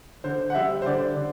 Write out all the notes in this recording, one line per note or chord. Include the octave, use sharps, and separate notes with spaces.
D3 C5
F#5
G3 E5
C5
D3 D5
D3